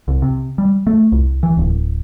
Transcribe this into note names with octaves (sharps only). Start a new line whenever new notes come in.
C2
C3
G3
A3
C2
E3
D1